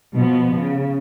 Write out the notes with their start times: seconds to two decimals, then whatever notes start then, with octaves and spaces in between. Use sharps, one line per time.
0.15 B2 F3 B3
0.55 C#3